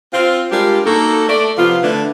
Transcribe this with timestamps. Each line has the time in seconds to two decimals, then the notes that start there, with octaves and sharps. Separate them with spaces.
0.14 C4 F4
0.52 G3 G#3 D4 F4 G4 A#4
0.86 A#3 D#4 F#4 A4
1.29 A3 D5
1.58 C3 F3 B3 F4
1.83 D3 A3 D4 E4 B4